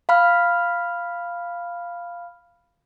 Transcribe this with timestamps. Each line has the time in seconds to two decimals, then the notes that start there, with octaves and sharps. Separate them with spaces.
0.09 F5 B5 F6